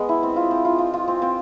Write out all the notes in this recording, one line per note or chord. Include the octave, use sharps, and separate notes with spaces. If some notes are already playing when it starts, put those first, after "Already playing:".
Already playing: G#3 B3
E4
C4
F4
C4
F4
F4
F4
C4
C4